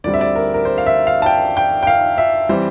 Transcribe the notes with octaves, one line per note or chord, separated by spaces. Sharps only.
D2 D3 G3 C4 D5
E5
D5
A#4
A#4
C5
F5
E5
F5
A5
G5
G5
G5
F5
E5
E3 G3 C4 C5